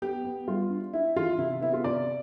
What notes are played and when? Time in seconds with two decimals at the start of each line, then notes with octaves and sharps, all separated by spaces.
0.02 B3 G4
0.24 B3
0.48 G3 F4
0.70 D4
0.93 D4 E4
1.16 E3 F4
1.38 C3 E4
1.61 B3 E4
1.73 F4
1.84 C3 D5